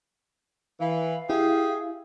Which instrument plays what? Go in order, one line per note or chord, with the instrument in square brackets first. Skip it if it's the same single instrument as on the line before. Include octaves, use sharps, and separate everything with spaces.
[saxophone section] E3 [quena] F5
[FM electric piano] E4 [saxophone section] G4 G#4